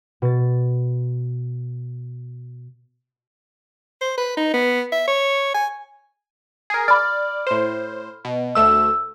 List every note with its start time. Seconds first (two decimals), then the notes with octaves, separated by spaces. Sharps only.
0.22 B2 A6
4.01 C5
4.18 B4
4.37 D#4
4.54 B3
4.92 E5
5.08 C#5
5.55 G#5
6.70 G#4 A#4
6.88 D5 B5 F6
7.47 A2 C5
8.25 B2
8.55 D2 A3 E6 E7